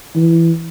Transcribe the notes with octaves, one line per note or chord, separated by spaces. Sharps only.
E3